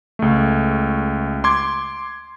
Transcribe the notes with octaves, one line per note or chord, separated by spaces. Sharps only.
C#2 A3
C6 D6 G#6